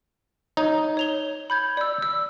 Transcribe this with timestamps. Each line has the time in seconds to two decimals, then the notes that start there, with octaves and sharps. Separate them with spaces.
0.57 D#4 C#5
0.97 C#5 F7 G7
1.50 B5 G6 G#6
1.77 D5 E6
2.02 E6